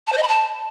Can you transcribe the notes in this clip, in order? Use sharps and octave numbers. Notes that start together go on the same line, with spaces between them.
A5
C5
D#5
B5
A5